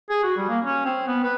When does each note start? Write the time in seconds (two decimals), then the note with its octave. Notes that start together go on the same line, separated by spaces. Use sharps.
0.10 G#4
0.23 F#4
0.37 G3
0.49 A#3
0.65 C#4
0.85 C4
1.08 B3
1.24 B4